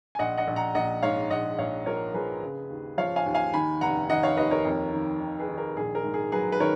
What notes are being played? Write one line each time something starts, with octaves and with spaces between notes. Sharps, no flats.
G#5
A#1 D#5 F#5
D#5 F#5
A#1
F#5 A#5
A#1 D#5 F#5
G#2 C#5 F5
A#1 D#5 F#5
A#1 C#5 F5
F3 A#4 C#5
F3 G#4 B4
C#3
D#2
F3 C#5 F5
F5 G#5
D#2
F5 G#5
D#3 G#5 B5
F1 F#5 A#5
D#3 D#5 F#5
C#5 F5
D#2 B4 D#5
A#4 C#5
F2
D#3
D#3
G#4 B4
D#3
A#4
A#1 G#4
A#4
G#2
G#4
F#3 G#4 B4
B4
D#3 A#4 C#5